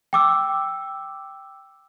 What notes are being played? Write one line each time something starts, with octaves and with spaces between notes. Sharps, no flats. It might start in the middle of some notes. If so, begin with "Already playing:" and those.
G5 D6 E6